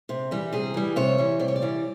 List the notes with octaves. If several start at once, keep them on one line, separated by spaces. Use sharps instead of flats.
C3
E3 G3
C3 G#4
E3 G3
C3 C#5
E3 G3
C3 D5
C#5
D5
E3 G3